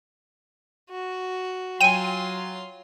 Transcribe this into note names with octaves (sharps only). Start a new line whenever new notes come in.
F#4
F#3 F4 G5 G#5 C6 D#7